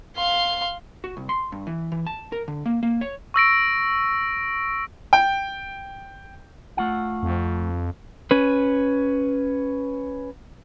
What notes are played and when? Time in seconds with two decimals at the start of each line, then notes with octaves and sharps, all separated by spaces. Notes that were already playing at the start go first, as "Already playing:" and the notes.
0.16 F5 C6
1.04 F#4
1.17 C2
1.29 C6
1.52 G2
1.67 E3
1.92 E3
2.07 A5
2.32 A#4
2.48 D3
2.66 A#3
2.83 A#3
3.01 C#5
3.34 C#6 E6 A#6 D7
5.13 G5
6.77 A3 F4 F#5
7.23 F2
8.31 C#4 B4